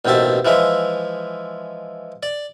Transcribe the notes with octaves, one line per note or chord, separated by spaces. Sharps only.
A1 D#2 B2 C4 E5 A5
E3 F3 G#3 E5
D5